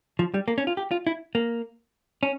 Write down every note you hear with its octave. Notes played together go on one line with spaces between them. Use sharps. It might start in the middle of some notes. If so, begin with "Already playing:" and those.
F3
G3
A#3
C#4
F4
G4
F4
E4
A#3
C#4